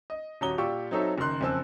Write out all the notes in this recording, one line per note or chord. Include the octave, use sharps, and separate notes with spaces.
D#5
D#1 F#4 C#5 A#5 D#6 G7
A#2 F4 G4 D5 C#6 E6
F#3 C4 D#4 A4 C#5 E5
F#1 D#3 D#4 C6 F#6
F#1 F2 C4 G#5 A5 E6